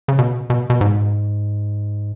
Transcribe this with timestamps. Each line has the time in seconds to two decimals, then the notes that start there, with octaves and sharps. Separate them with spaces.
0.08 C#3
0.19 B2
0.50 B2
0.70 B2
0.81 G#2